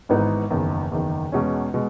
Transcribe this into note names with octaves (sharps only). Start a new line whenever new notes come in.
G#1 G#2 E3 B3 D#4
F#1 E2 D#3
F#1 E2 D#3
E2 B2 G#3 C#4
B2 G#3